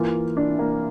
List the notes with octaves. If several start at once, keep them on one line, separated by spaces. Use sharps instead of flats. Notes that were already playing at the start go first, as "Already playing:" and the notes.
Already playing: E3 A#3 F4
D4
A#3